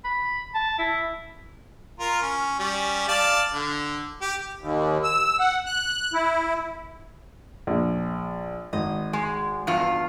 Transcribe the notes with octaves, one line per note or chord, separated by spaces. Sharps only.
B5
A5
E4
F4 A#4
C#4
G3 C#4
D5 F5 A5
D3
G4
D#2
E6
F#5
F#6
E4
A#1
G#1 D#5
G#3
E2 G2 F4